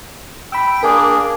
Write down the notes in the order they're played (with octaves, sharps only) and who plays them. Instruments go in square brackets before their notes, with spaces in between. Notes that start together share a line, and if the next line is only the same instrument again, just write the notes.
[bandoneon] G5 [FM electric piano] B5 E6
[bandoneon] A#3 D4 G#4 [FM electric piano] A#4 G#5 D6